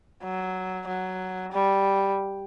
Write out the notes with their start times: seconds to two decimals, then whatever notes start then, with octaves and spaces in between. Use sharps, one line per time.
0.23 F#3
0.87 F#3
1.53 G3